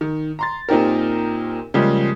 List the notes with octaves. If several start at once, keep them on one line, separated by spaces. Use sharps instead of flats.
D#3
A#5 C6 A6
A#2 C4 D#4 G4 A#4
C#3 F3 G3 G#3 A#3